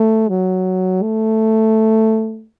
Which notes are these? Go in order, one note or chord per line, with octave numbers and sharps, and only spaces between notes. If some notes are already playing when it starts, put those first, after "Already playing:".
Already playing: A3
F#3
A3